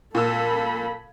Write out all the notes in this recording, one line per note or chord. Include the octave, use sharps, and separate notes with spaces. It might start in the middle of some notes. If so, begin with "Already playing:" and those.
A#2 A4 B5 E6